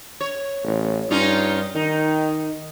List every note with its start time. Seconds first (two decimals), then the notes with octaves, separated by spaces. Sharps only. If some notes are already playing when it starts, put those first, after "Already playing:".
0.20 C#5
0.64 A1
1.10 G2 C#4 D#4 F4
1.75 D#3 D#4